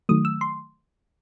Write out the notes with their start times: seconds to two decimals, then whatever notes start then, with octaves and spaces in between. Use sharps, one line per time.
0.09 D#3 F#3 A3 D#6
0.25 E6
0.41 C6